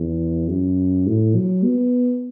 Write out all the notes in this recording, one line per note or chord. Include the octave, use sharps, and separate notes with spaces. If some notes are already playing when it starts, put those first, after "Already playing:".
Already playing: E2
F#2
A2
F#3
B3